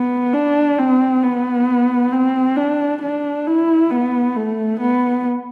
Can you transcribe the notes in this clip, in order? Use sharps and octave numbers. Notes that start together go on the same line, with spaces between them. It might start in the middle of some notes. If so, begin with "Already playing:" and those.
Already playing: B3
D4
C4
B3
C4
D4
D4
E4
B3
A3
B3